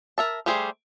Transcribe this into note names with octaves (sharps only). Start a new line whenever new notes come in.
A#4 E5 A5
G3 A3 G4 G#4 C5